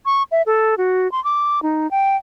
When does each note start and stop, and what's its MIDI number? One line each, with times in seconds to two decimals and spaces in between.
0.06 0.23 85
0.32 0.42 76
0.46 0.77 69
0.78 1.10 66
1.12 1.22 84
1.24 1.62 86
1.63 1.90 63
1.91 2.16 79